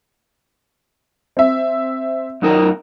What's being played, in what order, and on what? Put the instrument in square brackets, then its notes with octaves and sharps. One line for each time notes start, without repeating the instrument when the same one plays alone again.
[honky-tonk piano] C4 E5
[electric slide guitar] F#2 D#4 A#4